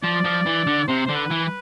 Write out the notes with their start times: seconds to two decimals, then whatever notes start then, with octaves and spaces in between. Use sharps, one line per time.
0.03 F3 D5
0.24 F3
0.46 E3
0.67 D3
0.88 C3 C5
1.06 D3 C5
1.16 B4
1.31 E3
1.45 B4